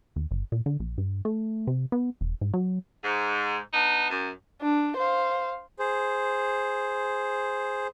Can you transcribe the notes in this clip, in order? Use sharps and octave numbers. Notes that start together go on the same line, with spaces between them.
D#2
G1
A#2
D3
A#1
G2
A3
C3
B3
E1
G#2
F#3
G#2
B3 D4 D#4
F#2
D4
C5 F5
G#4 C5